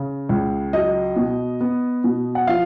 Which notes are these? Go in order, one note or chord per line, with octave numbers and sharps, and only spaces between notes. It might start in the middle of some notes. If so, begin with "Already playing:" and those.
Already playing: C#3
C#2
F#3 D#5
B2
B3
B2
F#5
F3 F5